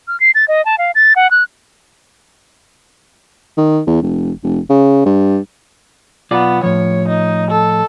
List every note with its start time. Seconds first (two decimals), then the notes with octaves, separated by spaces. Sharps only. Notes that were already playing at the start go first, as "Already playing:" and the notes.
0.08 F6
0.20 C7
0.35 A6
0.48 D#5
0.65 A5
0.78 F5
0.95 A6
1.16 F#5
1.31 F#6
3.57 D#3
3.87 E2
4.02 F1
4.44 F1
4.70 C#3
5.06 G2
6.31 B1 B3 F4 D5
6.63 A2 F3 C#5
7.08 D#4
7.50 A4